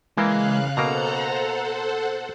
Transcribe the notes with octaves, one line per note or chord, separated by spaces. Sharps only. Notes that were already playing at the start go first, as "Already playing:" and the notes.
C#3 E3 G#3 A#3 F5 F#6
B2 A#3 A4 C5 F#5 A#5